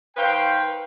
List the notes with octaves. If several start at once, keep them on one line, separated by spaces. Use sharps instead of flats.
D#3 B4 C5 F5 G5